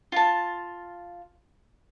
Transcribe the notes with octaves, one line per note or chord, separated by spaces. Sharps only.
F4 A5